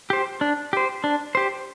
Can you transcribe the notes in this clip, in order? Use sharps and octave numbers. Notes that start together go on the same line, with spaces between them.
G4 C5
D4
G4 C5
D4
G4 C5